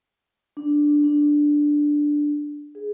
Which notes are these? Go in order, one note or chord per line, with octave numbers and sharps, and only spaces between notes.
D4
D4
G#4